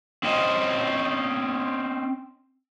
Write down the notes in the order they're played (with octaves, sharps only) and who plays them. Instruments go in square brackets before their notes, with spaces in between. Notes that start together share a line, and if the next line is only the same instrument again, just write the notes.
[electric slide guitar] C4 C#4 C5 D#5